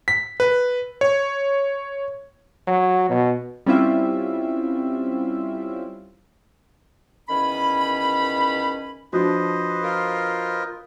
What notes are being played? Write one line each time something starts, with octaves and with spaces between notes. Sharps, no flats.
B6
B4
C#5
F#3
B2
G3 C4 C#4 E4 F4 E5
E2 D#3 C#4 B5
F3 D4 F#4 B4 C5 D#5
F4 A#4